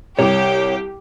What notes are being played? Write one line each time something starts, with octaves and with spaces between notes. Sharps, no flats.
C2 G4 C#5